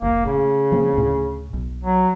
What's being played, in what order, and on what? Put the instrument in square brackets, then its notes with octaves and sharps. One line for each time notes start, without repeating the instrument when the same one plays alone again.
[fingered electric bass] F1 C2 [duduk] A#3
[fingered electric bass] A2 [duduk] C#3
[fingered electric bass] F3 A#3 C4
D2 A2
B1
[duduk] F#3